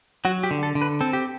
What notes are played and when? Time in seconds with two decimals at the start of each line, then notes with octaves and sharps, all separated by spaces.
0.25 F#3 F#4
0.43 G4
0.51 D3
0.63 A4
0.75 D3
0.82 B4
1.01 C4 A4
1.13 G4